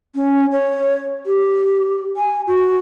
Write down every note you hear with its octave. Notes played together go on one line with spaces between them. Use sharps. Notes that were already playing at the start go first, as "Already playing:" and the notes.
C#4
C#5
G4
G#5
F#4